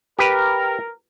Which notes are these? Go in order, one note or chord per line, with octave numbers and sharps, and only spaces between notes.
G4 A#4 B4